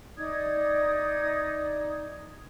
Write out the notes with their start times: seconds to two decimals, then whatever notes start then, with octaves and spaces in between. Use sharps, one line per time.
0.17 D#4 D5 D#6 G#6